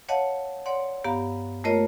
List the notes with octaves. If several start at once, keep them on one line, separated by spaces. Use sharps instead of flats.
C#5 D#5 F5 F#5 A5
C#5 D5 F#5 C6
G2 B3 G4 F5 A#5
A3 A#3 F4 A#4 C#5 D#5